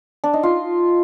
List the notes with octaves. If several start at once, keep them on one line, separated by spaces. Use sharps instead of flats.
D4
D#4
F4